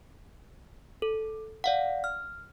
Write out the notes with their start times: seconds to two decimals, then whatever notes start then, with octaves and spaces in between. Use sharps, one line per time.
1.02 A4
1.64 D5 F5 F#5
2.04 F6